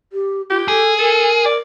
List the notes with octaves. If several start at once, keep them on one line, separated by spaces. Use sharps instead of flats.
G4
F4 G4
G#4 A4
A4 A#4
D5